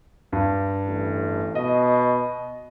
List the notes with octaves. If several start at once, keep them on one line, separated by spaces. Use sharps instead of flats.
G2
A1
B2 D#5